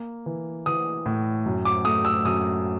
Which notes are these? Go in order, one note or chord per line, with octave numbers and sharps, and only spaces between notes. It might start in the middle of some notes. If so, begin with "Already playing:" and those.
Already playing: A#3
E3
E3 D#6
A2
F#2
D6
A3 D#6
E6
F#2 D#6